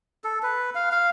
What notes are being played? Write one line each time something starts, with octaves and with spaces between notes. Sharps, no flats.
A4
B4
F5
F5